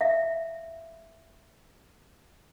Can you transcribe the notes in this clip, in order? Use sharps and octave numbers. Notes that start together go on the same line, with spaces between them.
E5 F5